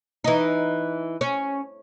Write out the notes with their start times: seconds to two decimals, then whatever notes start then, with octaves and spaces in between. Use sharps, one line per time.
0.24 E3 D#4
1.21 C#4